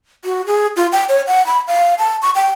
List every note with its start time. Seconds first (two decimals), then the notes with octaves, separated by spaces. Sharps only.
0.25 F#4
0.47 G#4
0.76 F4
0.92 G5
1.09 C#5
1.27 F#5
1.46 B5
1.68 F5
1.99 A5
2.22 C#6
2.35 G5